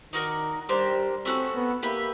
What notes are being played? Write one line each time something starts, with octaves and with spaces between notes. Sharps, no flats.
D#3 D#4 F#4 A#4 D5
G3 A#3 D4 G4 C5
A3 C4 C#4 F#4 A4
B3
A#3 G4 B4 E5